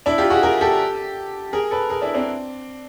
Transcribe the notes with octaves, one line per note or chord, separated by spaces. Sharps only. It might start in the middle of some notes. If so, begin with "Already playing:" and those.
D4 E4
F4 G4
F#4 G#4
G#4 A#4
G4 A4
G#4 A#4
A4 B4
G#4 A#4
D4 E4
C4 D4